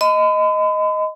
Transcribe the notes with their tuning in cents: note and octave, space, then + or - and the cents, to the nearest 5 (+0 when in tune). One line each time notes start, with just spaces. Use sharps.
D#5 +5 B5 +45